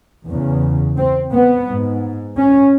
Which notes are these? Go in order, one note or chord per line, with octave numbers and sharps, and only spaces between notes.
E2 C#3
C4
B3
G#2
C#4